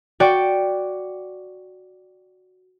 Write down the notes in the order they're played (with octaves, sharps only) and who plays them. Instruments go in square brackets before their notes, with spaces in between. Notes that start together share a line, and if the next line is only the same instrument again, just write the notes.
[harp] F#4 D5 G5